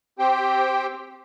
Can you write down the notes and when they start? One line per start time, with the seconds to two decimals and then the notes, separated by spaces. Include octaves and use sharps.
0.19 C4 G4 C5 G5